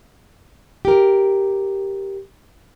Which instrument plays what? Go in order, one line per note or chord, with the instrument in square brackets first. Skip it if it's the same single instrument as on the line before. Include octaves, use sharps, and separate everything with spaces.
[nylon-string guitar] G4 A#4